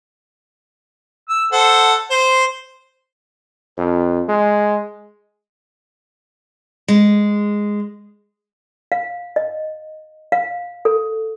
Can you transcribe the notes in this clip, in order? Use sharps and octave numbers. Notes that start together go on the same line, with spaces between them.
E6
A4 C5 F#5
C5
F2
G#3
G#3
F5
D#5
F5
A4